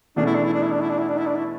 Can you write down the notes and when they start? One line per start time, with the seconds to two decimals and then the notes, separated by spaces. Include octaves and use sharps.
0.16 E2 B2 A3 C#4 D4
0.26 E4
0.35 D4
0.44 E4
0.53 D4
0.62 E4
0.71 D4
0.81 E4
0.90 D4
0.98 E4
1.08 D4
1.18 E4
1.26 D4
1.35 E4